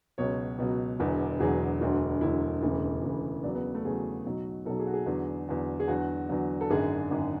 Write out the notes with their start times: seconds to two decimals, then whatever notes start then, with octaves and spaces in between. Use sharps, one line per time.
0.18 C#2 B2 F#3 C#5
0.58 C#2 B2 F#3
1.00 E1 E2 D3 F#3
1.40 E1 E2 D3 F#3 G#4
1.81 E1 D2 D3 F#3
2.21 E1 D2 D3 F#3 E4
2.63 E1 D2 C#3 E3
3.03 E1 D2 C#3 E3
3.43 E2 C#3 F#3 D4
3.55 B3
3.75 A3
3.85 E2 C#3 F#3 G#4
4.26 B1 B2 F#3
4.66 B1 B2 F#3 A4
4.80 G#4
4.87 F#4
4.94 G#4
5.06 E2 D3 F#3
5.48 E2 D3 F#3
5.80 G#4
5.88 E2 D3 F#3 F#4
6.29 E2 D3 F#3
6.61 A4
6.70 G#1 F#2 D3 G#4
7.11 G#1 F#2 D3